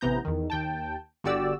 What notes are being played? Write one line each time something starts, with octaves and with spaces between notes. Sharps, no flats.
A1 C3 E3 B3 A#5 G6
E2 D#3
D#2 G5 A5
G1 D3 F#4 G4 D5 E6